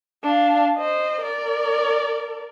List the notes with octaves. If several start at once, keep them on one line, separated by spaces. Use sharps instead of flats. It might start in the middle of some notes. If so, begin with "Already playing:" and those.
D4 F5
C5 D#5
A#4 D5